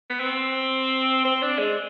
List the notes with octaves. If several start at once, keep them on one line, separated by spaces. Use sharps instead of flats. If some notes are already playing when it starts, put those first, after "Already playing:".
B3
C4
C4
D4
G#3